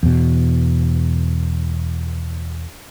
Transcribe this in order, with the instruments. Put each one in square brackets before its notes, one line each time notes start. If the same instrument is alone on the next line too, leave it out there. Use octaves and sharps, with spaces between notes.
[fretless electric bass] E2 B2